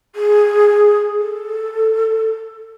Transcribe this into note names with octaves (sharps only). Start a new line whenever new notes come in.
G#4
A4